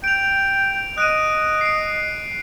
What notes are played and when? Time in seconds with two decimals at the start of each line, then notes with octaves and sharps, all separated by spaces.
0.04 G5 D7 F7
0.98 D#5 F#6 D7 D#7
1.61 C7 D7